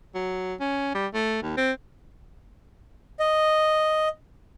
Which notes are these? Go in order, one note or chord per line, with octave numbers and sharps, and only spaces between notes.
F#3
C#4
G3
A3
D#2
C4
D#5